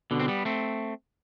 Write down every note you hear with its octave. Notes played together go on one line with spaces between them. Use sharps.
B2 D3
C4
G3 B3
A3 C4